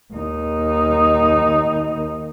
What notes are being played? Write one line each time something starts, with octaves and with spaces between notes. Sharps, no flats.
D#2 D#4